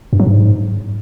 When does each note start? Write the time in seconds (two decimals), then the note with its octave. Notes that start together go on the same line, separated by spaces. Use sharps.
0.13 G2
0.20 F#3
0.26 G#2